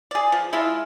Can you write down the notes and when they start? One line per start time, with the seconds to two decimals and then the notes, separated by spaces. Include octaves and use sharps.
0.11 G#4 D5
0.32 F3
0.53 G#3 E4 F4